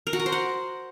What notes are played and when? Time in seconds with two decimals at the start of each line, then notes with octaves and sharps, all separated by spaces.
0.07 A#4
0.13 F#4
0.20 A#4
0.26 C5
0.32 F#5